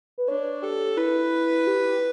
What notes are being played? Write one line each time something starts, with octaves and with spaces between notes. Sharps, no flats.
B4
D4 C#5
G4 A4
E4 B4
G4